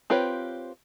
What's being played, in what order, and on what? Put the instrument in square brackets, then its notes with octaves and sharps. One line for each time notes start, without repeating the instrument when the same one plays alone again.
[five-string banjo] C4 F4 G4 B4 C#5